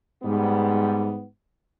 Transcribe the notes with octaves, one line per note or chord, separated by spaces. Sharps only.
G#2 G3 B3